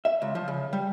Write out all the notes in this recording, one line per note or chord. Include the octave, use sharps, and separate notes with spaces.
E5
C#2
F3
C#3
G3